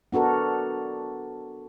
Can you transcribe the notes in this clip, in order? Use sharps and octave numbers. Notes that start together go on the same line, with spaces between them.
B3 D4 F#4 A4 A#4